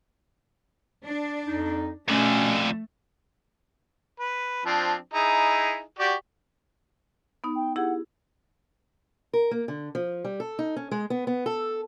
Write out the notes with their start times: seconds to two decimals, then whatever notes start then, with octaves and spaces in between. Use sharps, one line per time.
1.04 D4
1.46 F2 D#4
2.08 F2 B2 D3 A3 C#4
4.20 B4
4.66 F3 C4 D4
5.13 D#4 E4 G#4
5.99 F#4 G4 D5
7.44 B3 D#4
7.55 G5
7.76 E4 G4 G#4 F#5
9.33 A#4
9.51 A#3
9.68 D3
9.95 F3
10.24 G3
10.40 A4
10.59 D#4
10.76 C#4
10.91 G#3
11.10 B3
11.27 B3
11.46 A4